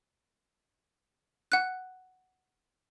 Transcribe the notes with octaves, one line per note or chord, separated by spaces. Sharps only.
F#5 F#6